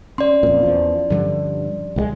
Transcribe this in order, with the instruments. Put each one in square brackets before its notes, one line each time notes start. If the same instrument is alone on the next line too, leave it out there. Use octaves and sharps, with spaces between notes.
[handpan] C#4 [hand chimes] D5 C6
[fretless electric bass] F2 A#2
E2 F3
[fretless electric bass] G2 D3 [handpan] F3 G3
[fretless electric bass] C#2 D#3 G#3